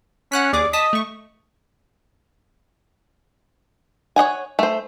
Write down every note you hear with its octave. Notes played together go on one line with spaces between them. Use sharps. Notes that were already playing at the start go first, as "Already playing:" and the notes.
C#4 F#5 F#6 B6
D#2 G#4 D5 D6
D#5 A5 D#6 B6
A3 C#6
C#5 D#5 F#5 G#5
A3 C5